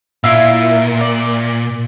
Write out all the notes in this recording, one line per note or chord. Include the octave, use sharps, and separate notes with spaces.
A#2 E4 F4
D5